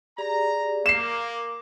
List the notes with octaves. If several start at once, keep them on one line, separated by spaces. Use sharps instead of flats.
G4 G#4 D5 A#5
A#3 A#4 D6 C7 E7